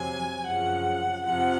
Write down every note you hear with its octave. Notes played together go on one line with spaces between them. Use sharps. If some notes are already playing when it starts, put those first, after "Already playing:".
Already playing: F2 C3 F#3 G#5
F#2 C#3 F3 F#5
F2 C3 F3 F#5